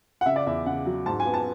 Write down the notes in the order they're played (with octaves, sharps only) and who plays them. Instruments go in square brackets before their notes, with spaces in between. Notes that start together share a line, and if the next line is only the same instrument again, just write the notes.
[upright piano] F#5
C#3 E5
D5
E2 E5
C#3 F#5
F#3
G#2 A5
G#5
B3
A5